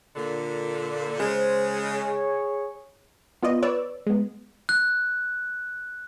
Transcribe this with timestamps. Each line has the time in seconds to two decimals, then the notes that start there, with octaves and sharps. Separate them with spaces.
0.16 A#2 D3
1.20 C#3 G#3 C5
1.93 G#4 C#5
3.43 B3 F4 D5 D#5
3.63 B4 C#5 D5 E6
4.07 G#3 B3
4.69 F#6